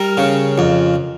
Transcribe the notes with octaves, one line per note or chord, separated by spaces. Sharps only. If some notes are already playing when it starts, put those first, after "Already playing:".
Already playing: G3 A#4
C#3
F2